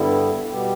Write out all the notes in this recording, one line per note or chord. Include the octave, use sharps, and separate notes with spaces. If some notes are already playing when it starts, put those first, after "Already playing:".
Already playing: G2 D3 G3 B3 E4
B2 G3 B3 G4